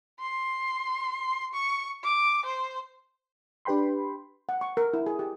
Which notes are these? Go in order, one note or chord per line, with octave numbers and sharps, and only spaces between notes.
C6
C#6
D6
C5
D4 G4 B4 G5 B5 C6
F#5
C#6
A#4
E4
G#4
G4